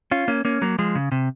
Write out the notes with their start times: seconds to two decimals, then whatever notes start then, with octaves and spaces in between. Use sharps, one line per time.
0.11 C#4 F4
0.28 A#3 C#4
0.45 A#3 C#4
0.62 F#3 A#3
0.79 F3 G#3
0.95 C#3
1.12 C3